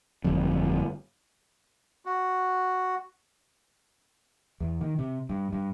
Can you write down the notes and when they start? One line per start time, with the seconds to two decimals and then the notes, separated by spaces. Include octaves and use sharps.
0.24 G1 F2
2.05 F#4
4.60 E2
4.81 D#3
4.99 C3
5.30 G2
5.53 G2